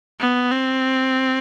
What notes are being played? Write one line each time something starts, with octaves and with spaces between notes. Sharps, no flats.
B3
C4